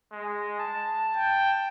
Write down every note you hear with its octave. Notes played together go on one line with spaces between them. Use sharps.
G#3
A5
G5